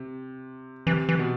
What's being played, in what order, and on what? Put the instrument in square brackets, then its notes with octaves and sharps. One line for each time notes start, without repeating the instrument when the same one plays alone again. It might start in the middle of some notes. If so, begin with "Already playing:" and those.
Already playing: [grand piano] C3
[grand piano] C3 [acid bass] E3
[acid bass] E3
[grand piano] B2